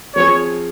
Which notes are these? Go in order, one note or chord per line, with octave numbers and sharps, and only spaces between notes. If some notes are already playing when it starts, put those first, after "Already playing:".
F3 C4 F4 G#4 C#5